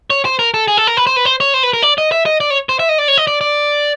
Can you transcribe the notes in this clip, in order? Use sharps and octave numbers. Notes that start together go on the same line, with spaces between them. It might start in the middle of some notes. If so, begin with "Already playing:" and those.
C#5
C5
A#4
A4
G#4
A4
A#4
B4
C5
B4
C5
C#5
C5
B4
A#4
D5
D#5
E5
D#5
D5
C#5
C5
E5
D#5
D5
C#5
D#5
D5
D5